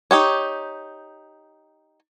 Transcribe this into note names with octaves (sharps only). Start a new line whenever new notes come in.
D#4 G4 C#5